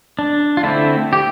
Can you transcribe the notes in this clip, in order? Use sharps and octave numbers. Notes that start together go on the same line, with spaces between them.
D4
F4
D3 A3 C4 E4
G4